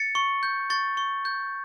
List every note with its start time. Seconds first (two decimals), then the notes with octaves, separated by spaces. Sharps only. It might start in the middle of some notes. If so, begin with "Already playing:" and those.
Already playing: A6 C#7
0.15 C#6
0.43 G6
0.70 C#6 A6
0.97 C#6
1.25 G6